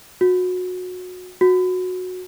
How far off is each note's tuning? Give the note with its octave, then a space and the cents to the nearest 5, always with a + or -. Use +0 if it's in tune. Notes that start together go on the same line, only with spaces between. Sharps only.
F#4 -25
F#4 -15